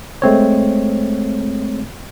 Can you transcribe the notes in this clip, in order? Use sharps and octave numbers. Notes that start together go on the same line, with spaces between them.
G#3 A3 C4 C#5